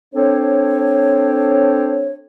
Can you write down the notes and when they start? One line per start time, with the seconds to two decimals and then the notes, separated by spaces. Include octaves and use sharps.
0.14 C4 D4 A4 C5 C#5